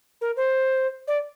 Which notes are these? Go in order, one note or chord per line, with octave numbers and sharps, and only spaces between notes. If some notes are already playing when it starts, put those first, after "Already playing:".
A#4
C5
D5